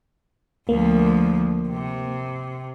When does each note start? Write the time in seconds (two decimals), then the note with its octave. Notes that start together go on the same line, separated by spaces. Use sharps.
0.69 D2 F3 A#3
1.68 C3